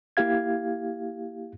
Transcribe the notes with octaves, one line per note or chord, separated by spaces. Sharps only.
A#3 E4 G4 F5 G#6